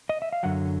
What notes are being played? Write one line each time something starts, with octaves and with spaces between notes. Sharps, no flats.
D#5
E5
F5
F#2 D3 F#3 F#5